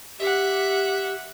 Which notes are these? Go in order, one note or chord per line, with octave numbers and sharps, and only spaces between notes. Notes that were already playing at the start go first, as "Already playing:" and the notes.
G4 E5 F#5